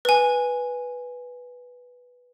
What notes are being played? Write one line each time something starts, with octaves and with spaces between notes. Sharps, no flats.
B4 G#5